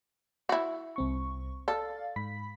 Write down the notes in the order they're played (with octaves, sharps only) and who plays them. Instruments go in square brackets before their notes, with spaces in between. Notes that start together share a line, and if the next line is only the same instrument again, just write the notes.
[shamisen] E4 F#4
[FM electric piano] C2 C4 C#6
[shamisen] A4 [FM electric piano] D5 F5 A6
[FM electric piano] G#2 B5 B6